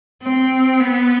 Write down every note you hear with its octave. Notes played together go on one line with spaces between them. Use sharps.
C4
B3